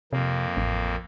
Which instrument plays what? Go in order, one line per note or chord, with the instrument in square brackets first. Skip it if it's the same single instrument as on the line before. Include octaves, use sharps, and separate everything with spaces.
[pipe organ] F2 A#3 [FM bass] C3
[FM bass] A1